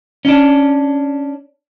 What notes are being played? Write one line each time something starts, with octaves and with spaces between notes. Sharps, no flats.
C#4 D4